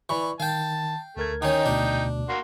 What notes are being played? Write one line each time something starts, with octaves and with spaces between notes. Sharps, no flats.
E3 D5 B5 C#6
D#3 F5 G5 A5
D2 A3 A#4 G#6
D#3 C#4 D#4 G5
D2 B2 D4
A#3 F#4 C6